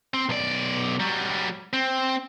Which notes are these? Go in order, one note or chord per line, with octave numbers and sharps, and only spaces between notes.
C4
B1 D5
F#3 G3
C4